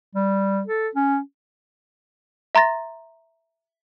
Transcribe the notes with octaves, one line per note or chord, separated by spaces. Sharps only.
G3
A4
C#4
E5 A#5 C6 A6 A#6